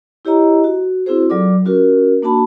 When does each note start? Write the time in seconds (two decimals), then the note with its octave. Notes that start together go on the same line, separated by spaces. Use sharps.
0.25 E4 G4 C#5 D#5 A#5
0.64 F#4
1.06 C4 E4 F#4 G#4 C5
1.30 F#3 F4 A4 D5 D6
1.65 C#4 F4 F#4 A#4
2.22 A#3 D4 F#4 A5 B5